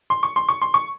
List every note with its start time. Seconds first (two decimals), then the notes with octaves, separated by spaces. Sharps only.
0.10 C6
0.23 C#6
0.36 C6
0.49 C#6
0.61 C6
0.74 C#6